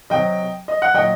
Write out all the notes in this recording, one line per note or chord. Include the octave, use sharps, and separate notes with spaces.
C3 F#3 D#5 G5
D#5
F#5
A#2 F#3 D#5 G5